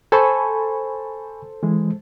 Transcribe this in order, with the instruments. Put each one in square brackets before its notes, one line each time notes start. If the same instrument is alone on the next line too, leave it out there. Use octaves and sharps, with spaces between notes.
[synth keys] A4 C5 [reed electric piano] G#5 B5 C#6
[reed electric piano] E3 G#3